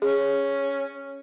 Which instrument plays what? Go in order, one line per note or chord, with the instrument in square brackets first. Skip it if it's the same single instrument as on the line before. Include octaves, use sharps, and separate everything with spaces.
[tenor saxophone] C#4 [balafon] G#4